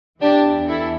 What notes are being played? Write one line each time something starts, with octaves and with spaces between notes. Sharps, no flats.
E2 E3 D4 G4
E4 A4